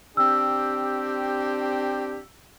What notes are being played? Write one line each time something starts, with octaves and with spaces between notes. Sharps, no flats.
C4 D4 G4 E6